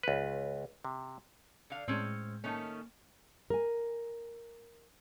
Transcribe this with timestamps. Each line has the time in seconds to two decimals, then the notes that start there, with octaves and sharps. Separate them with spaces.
0.03 C#2 B4
0.85 C3
1.70 D3 F5
1.88 A2 G#3 C4 C#4
2.44 D#3 A3 A#3 C#4
3.50 A#4 G#5